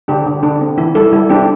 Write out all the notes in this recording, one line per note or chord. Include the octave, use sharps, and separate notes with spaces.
D3 D4 G4
D3
D3 D4
C4
E3 E4
G3 E4 A4
G3 E4
C4 D4 G4